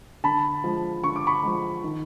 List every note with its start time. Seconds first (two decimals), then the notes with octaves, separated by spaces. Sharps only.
0.24 D3 A5 B5
0.64 F3 G#3
1.04 D3 C#6
1.16 D6
1.27 B5 C#6
1.43 F3 G#3
1.84 D#3